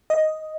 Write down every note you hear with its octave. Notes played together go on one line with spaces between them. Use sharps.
D#5